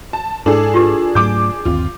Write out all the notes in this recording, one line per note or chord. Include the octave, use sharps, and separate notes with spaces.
A5
G#2 D4 E4 G#4 A4
F4 G4 B4
G#2 F#3 A3 D6 G6
G1 D#2 C4 F4